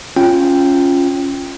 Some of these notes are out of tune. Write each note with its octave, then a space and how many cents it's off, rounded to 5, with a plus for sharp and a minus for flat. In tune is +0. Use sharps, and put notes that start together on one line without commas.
C#4 +0 F4 +0 G5 +0